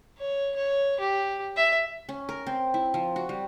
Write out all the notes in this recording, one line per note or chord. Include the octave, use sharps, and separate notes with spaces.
C#5
C#5
G4
E5
C#4
A#4
C4
E4
F3
F#4
G3